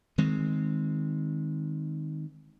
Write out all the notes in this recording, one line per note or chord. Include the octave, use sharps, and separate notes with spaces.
D#3 G#3 C4